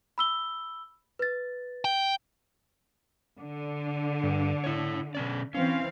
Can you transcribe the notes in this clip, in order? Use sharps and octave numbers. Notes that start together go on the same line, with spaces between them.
B5 E6 G7
B4 A6
G5
D3
G2
E4 C#5
B2 C#4 D5
E3 C4 C#4 F5